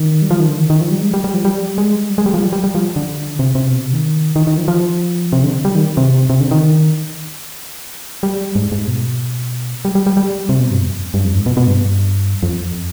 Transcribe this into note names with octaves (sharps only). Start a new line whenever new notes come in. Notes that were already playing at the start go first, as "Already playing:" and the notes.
Already playing: D#3
G3
F3
D#3
D3
D#3
D#3
F3
G3
G#3
G3
G3
F3
G3
G#3
G3
G#3
G3
F3
G3
G3
G3
F3
D3
C3
C3
B2
C3
D#3
D#3
D#3
F3
F3
C3
D3
G3
D#3
C3
C3
D3
D#3
G3
G#2
G#2
B2
G3
G3
G3
G3
C3
B2
G2
F2
G2
F2
G#2
B2
B2
G2
F2